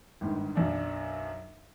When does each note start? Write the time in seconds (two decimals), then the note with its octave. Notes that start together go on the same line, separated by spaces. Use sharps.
0.21 G1 G#2 D#3
0.55 B1 F#2 D4